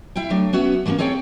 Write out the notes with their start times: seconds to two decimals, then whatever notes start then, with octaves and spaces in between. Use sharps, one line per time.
0.16 E4 E5 F5 G5
0.30 F#3 A3 D4
0.53 B3 C#4 F#4 E5
0.85 E3 F#3 A3 A#3 C#4
0.98 C4 G#4 A4 C#5 G5